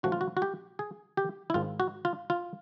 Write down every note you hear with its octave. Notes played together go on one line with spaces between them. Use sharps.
A#2 F3 A3 C#4 E4 F#4
F4
F#4
F#4
G4
G#4
G4
E4
G#2 D#3 G#3 C4 F4
F#4
F4
F4